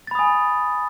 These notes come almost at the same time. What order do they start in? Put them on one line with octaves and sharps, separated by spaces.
A6 B5 D#6 G#5